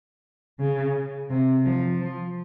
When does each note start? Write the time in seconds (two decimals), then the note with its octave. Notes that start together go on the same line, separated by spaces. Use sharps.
0.59 C#3
1.30 C3
1.65 F3
2.00 F3